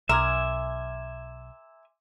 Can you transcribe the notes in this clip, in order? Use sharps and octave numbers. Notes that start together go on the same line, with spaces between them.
B1 A#4 E5 G#5 C6 D6 G#6